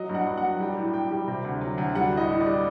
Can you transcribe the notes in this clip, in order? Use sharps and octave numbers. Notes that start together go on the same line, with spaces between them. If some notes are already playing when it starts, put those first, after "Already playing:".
Already playing: F#3 D#5
G2
F#5
G2
F#5
F#3
G3 G5
A2
A2 G5
G3
C3
D2
F#3
D2
G3 F#5
A2
D#5
A2
D5
G3